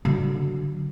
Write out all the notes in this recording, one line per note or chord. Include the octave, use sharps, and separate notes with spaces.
D3 F#3